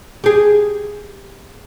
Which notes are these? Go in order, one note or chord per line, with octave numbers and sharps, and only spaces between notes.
G4 G#4